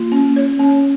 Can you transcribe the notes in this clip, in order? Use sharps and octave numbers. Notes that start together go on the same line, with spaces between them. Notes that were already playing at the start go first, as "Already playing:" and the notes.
Already playing: A#3 F4
C#4
C#5
C#4